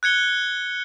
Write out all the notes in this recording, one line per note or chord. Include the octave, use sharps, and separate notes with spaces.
F#6 G#6 C#7 G7